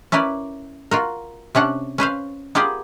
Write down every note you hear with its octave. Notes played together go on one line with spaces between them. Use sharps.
C#4 E4 A#4 B4 D5
F4 F#4 A#4
C3 C#4 D4 F#5
C#4 B4 C5 F5
B3 F4 G4 G#4 A#4 D5